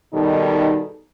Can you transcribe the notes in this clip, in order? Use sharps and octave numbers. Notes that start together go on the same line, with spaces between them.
B2 D#3 G3 D#4 G#4 A4